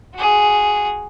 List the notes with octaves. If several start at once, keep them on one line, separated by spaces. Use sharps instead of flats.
F#4 G#4